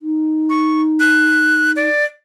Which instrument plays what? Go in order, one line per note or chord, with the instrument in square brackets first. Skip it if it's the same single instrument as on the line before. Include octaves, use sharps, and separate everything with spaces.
[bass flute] D#4
[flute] C#6
F#6
D5